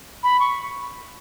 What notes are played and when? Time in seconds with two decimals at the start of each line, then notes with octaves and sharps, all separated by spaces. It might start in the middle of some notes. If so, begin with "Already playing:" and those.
0.23 B5
0.40 C#6